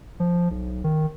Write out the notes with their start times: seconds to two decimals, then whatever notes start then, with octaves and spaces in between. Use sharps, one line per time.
0.20 F3
0.51 B1
0.84 D#3